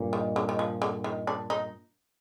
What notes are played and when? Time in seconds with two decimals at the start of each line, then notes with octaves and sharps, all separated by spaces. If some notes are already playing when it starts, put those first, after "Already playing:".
Already playing: G2 A#2
0.13 D#3
0.36 D3
0.49 D#3
0.59 F3
0.82 D3
1.04 D#3
1.27 D4
1.50 D#4